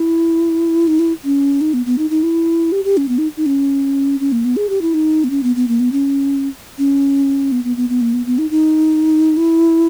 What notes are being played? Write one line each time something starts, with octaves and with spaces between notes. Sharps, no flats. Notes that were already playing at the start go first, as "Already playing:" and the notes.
Already playing: E4
D#4
E4
C#4
D#4
B3
B3
D#4
D#4
E4
G4
G4
C#4
B3
D#4
D#4
C#4
C#4
A#3
B3
G#4
G4
E4
D#4
B3
C#4
B3
B3
A#3
B3
C#4
C#4
B3
B3
B3
B3
A#3
B3
B3
D#4
D#4
E4